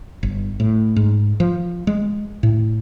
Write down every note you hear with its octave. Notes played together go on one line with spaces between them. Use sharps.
G1
A2
G#2
F3
G#3
A2